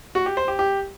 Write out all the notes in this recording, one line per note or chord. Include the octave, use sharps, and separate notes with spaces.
F#4
G4
C5
G4
G4